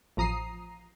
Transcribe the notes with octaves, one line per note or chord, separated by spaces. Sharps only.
A1 F3 A#5 D#6 C7